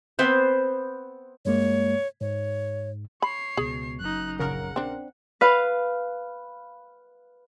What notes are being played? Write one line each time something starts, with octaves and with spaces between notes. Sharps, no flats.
B3 C4 B4 C5
G2 G#3 A#3 C#5
G#2 C#5
C#5 B5 C7
C#2 B2 G#4
F#1 F#2 D#4 F#6
A#1 C#3 A#4 F#5
C4 D4
B4 F5